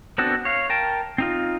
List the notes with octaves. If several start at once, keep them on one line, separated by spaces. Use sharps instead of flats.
B3 C4 D4 F#4 A4
C#5 F5
A#4 G5 A5
C4 D#4 F4